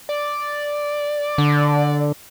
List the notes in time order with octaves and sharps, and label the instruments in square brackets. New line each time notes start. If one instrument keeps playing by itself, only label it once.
[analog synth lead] D5
[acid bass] D3